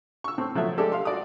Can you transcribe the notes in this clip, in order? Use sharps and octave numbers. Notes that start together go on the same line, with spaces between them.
C#6 E6
A2 C4
F3 F#3 A3 E5
G#3 D4 G4 A4
F5 C6
F#4 D5 D#6